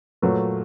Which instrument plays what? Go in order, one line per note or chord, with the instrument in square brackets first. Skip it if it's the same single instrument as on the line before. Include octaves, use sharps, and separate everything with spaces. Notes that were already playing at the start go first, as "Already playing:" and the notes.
[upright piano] A#2 F#3 A3 B4